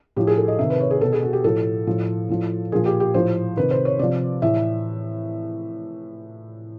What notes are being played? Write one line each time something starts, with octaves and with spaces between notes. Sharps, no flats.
A2 F3 G4
G#4
A4
D#5
C3 D#3 E5
B4
C#5
G#4
B2 A4
G#4
F#4
G4
A2 F3 A4
A2 F3
A2 F3
A#2 F3 G#4
G4
G4
A2 F3 C5
C3 D#3 B4
C5
C#5
C3 F3 D5
A2 E3 E5